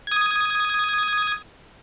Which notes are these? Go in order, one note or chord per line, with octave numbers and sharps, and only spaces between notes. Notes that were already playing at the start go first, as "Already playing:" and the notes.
D#6 G#6